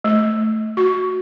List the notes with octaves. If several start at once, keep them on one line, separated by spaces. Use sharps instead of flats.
A3
F#4